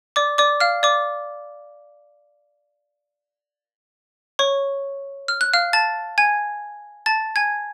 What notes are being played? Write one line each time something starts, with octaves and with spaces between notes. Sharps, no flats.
D5 D6
D5 D6
F5 F6
D5 D6
C#5 C#6
F6
F#6
F5 F6
A5 A6
G#5 G#6
A5 A6
G#5 G#6